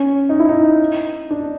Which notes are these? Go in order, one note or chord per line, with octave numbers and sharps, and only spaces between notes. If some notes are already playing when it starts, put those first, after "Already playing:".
Already playing: C#4
D#4
E4
D#4
D4